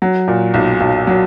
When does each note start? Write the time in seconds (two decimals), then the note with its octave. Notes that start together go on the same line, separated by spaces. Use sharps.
0.02 F#3
0.28 A#2
0.54 B1
0.80 B1
1.07 F#3